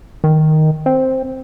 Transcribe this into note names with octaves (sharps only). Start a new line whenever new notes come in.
D#3
C4